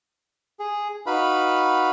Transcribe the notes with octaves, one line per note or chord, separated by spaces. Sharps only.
G#4
D#4 F#4 B4 F5 B5